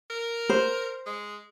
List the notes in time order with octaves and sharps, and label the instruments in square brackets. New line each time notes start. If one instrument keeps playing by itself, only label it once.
[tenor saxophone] A#4
[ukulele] C5
[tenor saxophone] G#3